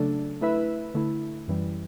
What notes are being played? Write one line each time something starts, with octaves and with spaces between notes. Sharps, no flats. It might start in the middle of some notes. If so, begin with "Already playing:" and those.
Already playing: C#3 F#3 A3 D4 A4
A3 E4 B4 E5
D3 A3 E4
F#2 E3 G3